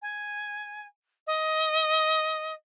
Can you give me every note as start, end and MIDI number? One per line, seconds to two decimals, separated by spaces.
0.02 0.85 80
1.27 2.53 75